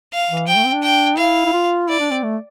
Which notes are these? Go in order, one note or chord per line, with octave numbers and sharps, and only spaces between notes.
F5
E3
F3 G5
A3
C4
D4
G5
E4 F5
E4
F4
E4 D5
D4
C4
A3